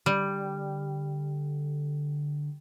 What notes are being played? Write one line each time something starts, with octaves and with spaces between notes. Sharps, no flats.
D3 G3